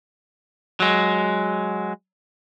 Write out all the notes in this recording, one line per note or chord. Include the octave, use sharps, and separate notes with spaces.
F#3 G#3